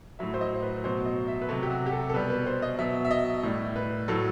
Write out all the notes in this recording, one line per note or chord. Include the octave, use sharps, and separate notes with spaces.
A2 F#3 E5
C5
D#5
C5
B4
B2 F#3 C5
D#5
E5
B4
C3 F#3 A4
G4
F#4
G4
A4
A4
B2 G3 B4
B4
C5
D#5
B2 F#3 E5
E5
D#5
A2 G3
B4
A2 F#3 A4